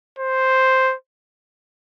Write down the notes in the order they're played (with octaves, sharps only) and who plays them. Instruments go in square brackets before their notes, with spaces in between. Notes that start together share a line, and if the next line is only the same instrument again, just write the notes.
[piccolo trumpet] C5